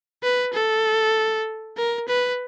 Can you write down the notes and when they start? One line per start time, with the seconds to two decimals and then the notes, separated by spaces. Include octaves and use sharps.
0.23 B4
0.53 A4
1.77 A#4
2.09 B4